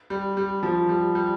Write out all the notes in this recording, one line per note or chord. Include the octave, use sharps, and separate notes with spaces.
G3
G3
F3
G3
G3